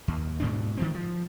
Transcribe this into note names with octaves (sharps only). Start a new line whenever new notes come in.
D#2
G#2 B2 D4
D#3 F3 C4
F3